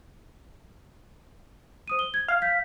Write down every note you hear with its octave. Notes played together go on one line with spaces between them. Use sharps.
C5 D#6 D#7
G7
G#6
F5
G6 B6